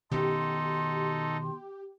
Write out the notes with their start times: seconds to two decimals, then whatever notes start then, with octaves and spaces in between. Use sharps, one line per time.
0.11 B2 D#3 B3 D#4 G4 A4 C6